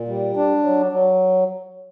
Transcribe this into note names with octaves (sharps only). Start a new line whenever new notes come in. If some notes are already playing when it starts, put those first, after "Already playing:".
Already playing: A#2
G3
D4
F#3
F#3